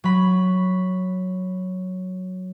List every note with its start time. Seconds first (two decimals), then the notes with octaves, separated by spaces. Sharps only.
0.04 F#3 B5